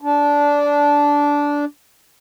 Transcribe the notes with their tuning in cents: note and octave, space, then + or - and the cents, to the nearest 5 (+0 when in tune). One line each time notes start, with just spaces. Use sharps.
D4 -15